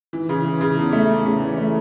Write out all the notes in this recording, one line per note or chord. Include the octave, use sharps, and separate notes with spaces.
E3
C#3
E3
C#3
E2
A3
A3
C#3
E3
A3